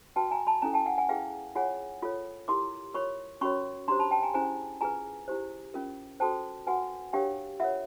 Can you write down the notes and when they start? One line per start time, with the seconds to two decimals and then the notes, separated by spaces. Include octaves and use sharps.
0.16 F#4 B4 G5 A5
0.31 G#5 A#5
0.47 A5 B5
0.62 C#4 E4 A4 G#5 A#5
0.74 G5 A5
0.86 F#5 G#5
0.98 F#5 G#5
1.09 E4 G#4 B4 F5 G5
1.55 F4 G#4 C#5 F#5 G#5
2.02 F4 A4 C#5
2.48 E4 G4 A#4 C6 D6
2.94 F4 A#4 C#5 B5 C#6
3.41 C#4 F#4 A#4 C#5 B5 C#6
3.88 D4 G4 C5 A#5 C6
3.99 A5 B5
4.11 G5 A5
4.23 G#5 A#5
4.34 C#4 E4 G#4 C5 G#5 A#5
4.81 F4 G#4 B4 G#5 A#5
5.28 E4 G4 C5
5.74 C#4 F4 A#4
6.20 F#4 A4 C5 G5 A5
6.67 F#4 B4 F#5 G#5
7.13 D4 G4 A#4 C#5 F5 G5
7.60 F4 A#4 C#5 E5 F#5